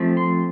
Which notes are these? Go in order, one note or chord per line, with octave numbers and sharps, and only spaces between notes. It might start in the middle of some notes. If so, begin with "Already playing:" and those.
Already playing: F3 A3 C4
C6